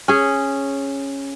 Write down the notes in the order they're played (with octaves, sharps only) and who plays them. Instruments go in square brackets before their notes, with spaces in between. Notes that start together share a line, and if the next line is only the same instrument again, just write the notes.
[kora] C#4 G#4